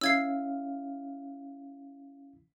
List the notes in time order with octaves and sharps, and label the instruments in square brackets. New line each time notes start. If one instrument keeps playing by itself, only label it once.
[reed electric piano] C#4 E4 F5 [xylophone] E6 G#6 C7